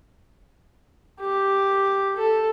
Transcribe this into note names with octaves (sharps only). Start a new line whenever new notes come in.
G4
A4